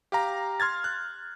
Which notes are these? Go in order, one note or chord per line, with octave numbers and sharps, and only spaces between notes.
G4 F5 A#5
C6 F6 G#6 A6
F#6